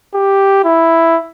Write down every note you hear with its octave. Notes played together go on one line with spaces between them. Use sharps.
G4
E4